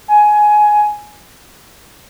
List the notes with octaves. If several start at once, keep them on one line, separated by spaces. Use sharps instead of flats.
G#5